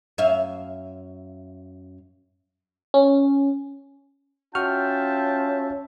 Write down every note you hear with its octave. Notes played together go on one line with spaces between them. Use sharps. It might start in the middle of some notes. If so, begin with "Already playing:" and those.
F#2 E5 F5
C#4
C#4 F4 F#4 E5 G5 A5 C#6 F6